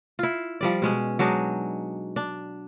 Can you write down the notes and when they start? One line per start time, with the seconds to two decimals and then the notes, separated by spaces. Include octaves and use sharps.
0.19 E4 F4
0.61 F3 G3 D5
0.82 B2 G#3 C#4
1.19 F#3 G#3 D4 D#4
2.16 D4